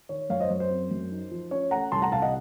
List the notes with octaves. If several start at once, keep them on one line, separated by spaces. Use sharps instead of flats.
D#3 C#5
F#2 C#5 F5
C5 D#5
F#2 C#5
C5
C4
F#2
D#4
F3
C#4 C#5
A3 F#5 A#5
C2 A5 C6
F#5 A#5
C3 F5 A5
D#5 F#5